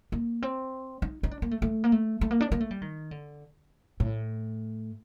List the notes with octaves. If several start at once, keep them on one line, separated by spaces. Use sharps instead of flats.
A#3
C4
D#4
D#4
D4
A#3
A3
A3
A#3
A3
A3
A#3
D4
A#3
A3
G3
D#3
D3
A2